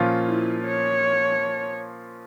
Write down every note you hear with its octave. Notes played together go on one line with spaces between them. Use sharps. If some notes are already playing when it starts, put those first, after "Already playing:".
Already playing: A#2 F3 C#4 F4
E4
C#5